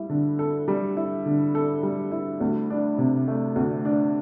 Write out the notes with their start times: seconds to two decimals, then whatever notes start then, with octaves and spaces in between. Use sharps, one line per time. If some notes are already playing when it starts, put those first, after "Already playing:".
Already playing: G3 E4
0.09 D3
0.39 A4
0.68 G3
0.97 E4
1.26 D3
1.55 A4
1.83 G3
2.12 E4
2.41 D2
2.70 D4
2.98 C3
3.28 A3
3.56 D2
3.85 D4